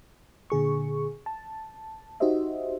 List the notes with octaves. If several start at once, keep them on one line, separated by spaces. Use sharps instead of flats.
A#2 D3 G#4 C#6
A5
D#4 F#4 G4 C5 D#5 E5